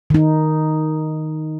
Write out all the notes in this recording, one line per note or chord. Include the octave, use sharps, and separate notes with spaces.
D#3 D#4